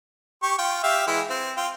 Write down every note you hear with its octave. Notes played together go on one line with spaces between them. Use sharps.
G4 C#6
F4 G5
G4 E5 F5
E3 G#3 E4
C4
F4 G5